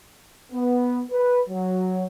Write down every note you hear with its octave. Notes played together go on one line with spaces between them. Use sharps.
B3
B4
F#3